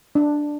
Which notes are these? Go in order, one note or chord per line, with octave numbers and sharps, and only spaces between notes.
D4